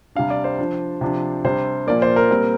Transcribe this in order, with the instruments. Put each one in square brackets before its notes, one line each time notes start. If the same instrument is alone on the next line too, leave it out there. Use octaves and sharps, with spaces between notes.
[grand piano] C3 G3 D4 F5
D5
C5
F3 D4
C3 F3 D4
C3 G3 D4 C5
A#2 F3 A#3 D5
C5
A#4
A#2 G3 C4